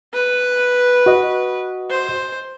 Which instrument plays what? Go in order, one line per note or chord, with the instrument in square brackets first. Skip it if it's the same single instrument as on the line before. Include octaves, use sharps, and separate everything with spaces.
[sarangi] B4
[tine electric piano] F#4 D#5
[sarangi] C5